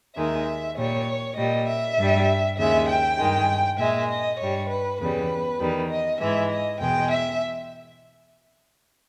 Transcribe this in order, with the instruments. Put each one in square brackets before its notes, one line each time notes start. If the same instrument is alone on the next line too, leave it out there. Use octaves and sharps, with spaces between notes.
[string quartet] D#2 D#3 G#3 E5
A#2 G3 C#5
A#2 G3 D#5
E5
G2 G3
D#2 C#3 G#3 E5
G5
G2 D#3 G#3
A#2 G#3 E5
D#5
G2 G3 C#5
B4
E2 C#3 G3 B4
E2 D#3 G3
D#5
G#2 E3 G#3 E5
D#5
E2 B2 G#3 G5
E5